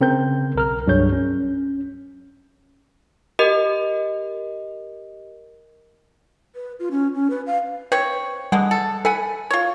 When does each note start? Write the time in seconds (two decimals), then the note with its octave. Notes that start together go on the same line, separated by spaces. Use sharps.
0.01 C#3 C4 A#4 G6
0.55 B1 A#4 F6
0.86 C2 G2 F#3 G#4 C#5 G6
1.13 C#4
3.39 G4 A#4 D#5
6.55 B4
6.79 F4
6.91 C#4
7.15 C#4
7.30 B4
7.47 F5
7.92 C4 B4 C#5
8.52 D3 G3 G#3 B3 F#5
8.71 A4
9.05 A4 F#5 G#5 B5
9.51 F4 C#5